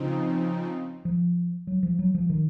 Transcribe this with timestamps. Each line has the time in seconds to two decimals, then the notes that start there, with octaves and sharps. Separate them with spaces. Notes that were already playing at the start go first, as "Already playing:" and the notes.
Already playing: C#3 F3 C4 D#4
1.05 F3
1.67 F#3
1.83 F3
1.99 F#3
2.15 F3
2.30 D#3